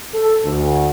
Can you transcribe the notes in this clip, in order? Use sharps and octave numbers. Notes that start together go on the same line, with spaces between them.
A4
D2